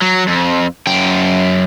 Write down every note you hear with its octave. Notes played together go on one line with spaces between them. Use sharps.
F#3
F2
F#2 G5